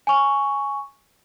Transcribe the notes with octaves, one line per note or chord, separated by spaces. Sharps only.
G#5 C#6